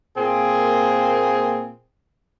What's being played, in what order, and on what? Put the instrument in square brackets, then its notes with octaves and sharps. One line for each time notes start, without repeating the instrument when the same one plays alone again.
[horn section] A#2 A#3 C4 G#4